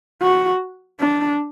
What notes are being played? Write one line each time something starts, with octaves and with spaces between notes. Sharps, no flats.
F#4
D4